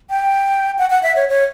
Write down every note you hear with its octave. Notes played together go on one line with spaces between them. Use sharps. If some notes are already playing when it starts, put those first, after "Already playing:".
G5
F#5
F#5
E5
C#5
C#5